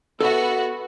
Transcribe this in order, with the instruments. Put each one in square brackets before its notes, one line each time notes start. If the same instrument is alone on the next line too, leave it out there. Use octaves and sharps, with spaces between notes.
[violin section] B3 F#4 [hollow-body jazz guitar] A4 E5